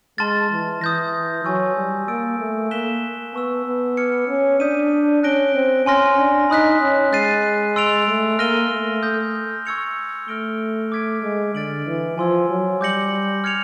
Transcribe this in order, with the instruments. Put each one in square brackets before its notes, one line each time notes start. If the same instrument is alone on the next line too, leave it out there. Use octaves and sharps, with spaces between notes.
[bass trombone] G#3 [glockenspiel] A5 C6 F6 A6
[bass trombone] E3
[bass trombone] E3 [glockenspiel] D#6 G6 A#6
[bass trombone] F#3 [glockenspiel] G#5 C#6 E6
[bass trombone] G3
[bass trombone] A#3 [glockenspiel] E6 A6 D7
[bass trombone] A3
[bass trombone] A#3 [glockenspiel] F#6 B6 E7 G7
[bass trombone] B3 [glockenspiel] A5 C#6 E6
[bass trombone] B3
[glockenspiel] D6 F6 G#6 C#7
[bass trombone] C#4
[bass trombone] D4 [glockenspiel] D#6 G6 B6 D#7
[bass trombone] C#4 [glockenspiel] F#6 A#6 D7 G7
[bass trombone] C4
[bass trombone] C#4 [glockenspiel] G#5 C6 F6 A#6
[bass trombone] D4
[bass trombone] D#4 [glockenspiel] B5 D#6 F#6 B6
[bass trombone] C#4
[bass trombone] G#3 [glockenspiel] F#6 A6 C7 D#7
[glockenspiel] C6 E6 A6 D7 F7
[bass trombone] A3
[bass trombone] A#3 [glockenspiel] F6 A#6 D#7 G7
[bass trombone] A3
[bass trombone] A3 [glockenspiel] D#6 G6 A#6
[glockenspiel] C#6 E6 G#6 C#7 F7
[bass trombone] A3 [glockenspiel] F6 A#6 D7 G7
[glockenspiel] D6 F6 G#6 B6 D7
[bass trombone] G#3
[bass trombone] D3 [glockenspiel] F6 A6 D7 F#7
[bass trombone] E3
[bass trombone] F3 [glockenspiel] G#5 C6 E6 G#6
[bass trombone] F#3
[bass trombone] G3 [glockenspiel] D6 G6 A#6 C#7 F#7
[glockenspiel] F6 G#6 C#7 F7